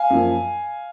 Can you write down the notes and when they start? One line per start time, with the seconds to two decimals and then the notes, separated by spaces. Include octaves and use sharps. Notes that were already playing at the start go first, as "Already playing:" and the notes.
Already playing: F5 G#5
0.10 F#2 F3 A#3